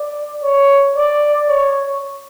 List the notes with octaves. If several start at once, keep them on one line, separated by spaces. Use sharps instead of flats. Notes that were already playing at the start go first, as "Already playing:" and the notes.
Already playing: D5
C#5
D5
C#5